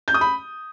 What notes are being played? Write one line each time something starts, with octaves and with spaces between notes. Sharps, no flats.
G6
D#6
B5